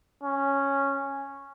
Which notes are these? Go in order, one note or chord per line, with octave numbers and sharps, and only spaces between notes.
C#4